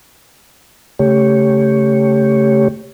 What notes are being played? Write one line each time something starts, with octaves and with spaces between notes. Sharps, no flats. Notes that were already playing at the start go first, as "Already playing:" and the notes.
C#3 A3 G4 C#5